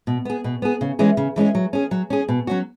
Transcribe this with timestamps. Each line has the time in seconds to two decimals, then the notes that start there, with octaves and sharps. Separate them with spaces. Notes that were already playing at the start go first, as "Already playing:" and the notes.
0.07 B2
0.25 B3 G#4
0.44 B2
0.62 B3 G#4
0.81 C#3
0.99 E3 G#3 C#4 G#4
1.17 C#3
1.36 E3 G#3 C#4 G#4
1.55 F#3
1.73 C#4 G#4
1.91 F#3
2.10 C#4 G#4
2.29 B2
2.47 F#3 C#4 F#4